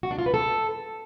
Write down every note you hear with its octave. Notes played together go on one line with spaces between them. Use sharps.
F#4
D4
F4
B4
A4